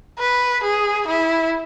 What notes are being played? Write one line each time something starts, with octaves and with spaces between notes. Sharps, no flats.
B4
G#4
E4